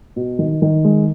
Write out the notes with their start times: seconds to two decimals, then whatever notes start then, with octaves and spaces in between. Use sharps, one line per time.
0.16 B2
0.39 D#3
0.62 D#3
0.84 G#3